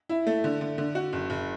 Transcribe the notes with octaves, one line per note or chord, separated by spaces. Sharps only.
E4
A3
D3
D3
D3
F#4
F#1
F#1